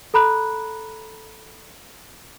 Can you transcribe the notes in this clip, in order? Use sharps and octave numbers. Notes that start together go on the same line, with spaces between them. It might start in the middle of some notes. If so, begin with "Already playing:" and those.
A4 A#5 B5 F#6